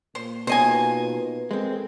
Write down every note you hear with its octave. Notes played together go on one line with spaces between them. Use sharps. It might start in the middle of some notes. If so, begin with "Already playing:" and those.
A#2 A#3 C5
B2 A#3 D#4 F4 B4 C5 D#5 G#5
G#3 C4 A4 A#4